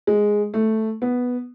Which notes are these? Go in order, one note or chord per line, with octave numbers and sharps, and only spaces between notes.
G#3
A3
B3